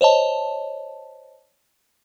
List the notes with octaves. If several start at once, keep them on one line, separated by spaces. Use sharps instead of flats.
C5 C#5 D#5 A5